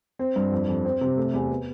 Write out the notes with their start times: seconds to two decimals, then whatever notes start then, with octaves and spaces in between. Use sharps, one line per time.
0.19 C4
0.36 G2
0.52 F2
0.68 F2
0.85 C4
1.01 C3
1.17 A3
1.34 E2
1.50 B3